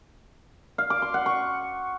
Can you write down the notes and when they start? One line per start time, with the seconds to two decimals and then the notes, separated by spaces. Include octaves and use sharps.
0.78 F5
0.90 D6
1.02 C6
1.14 F#5
1.26 C#6